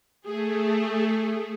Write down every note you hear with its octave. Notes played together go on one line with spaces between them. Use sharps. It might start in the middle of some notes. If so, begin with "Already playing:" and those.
A3 G#4